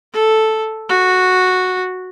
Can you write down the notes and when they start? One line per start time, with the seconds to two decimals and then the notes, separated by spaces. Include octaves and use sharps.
0.13 A4
0.89 F#4